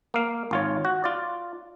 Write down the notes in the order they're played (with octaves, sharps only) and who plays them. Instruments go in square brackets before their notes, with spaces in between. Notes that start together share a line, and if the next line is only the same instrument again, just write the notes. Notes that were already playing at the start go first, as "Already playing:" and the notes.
[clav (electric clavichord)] A#3 F5
G#1 F4 C#5
F#4
F4 D5